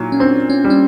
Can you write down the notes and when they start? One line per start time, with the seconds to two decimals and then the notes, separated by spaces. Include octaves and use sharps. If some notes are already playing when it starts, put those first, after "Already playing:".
Already playing: A#2 F#3 D#4 E4
0.12 C#4
0.20 C4 D4
0.50 C#4
0.64 G3
0.70 C#4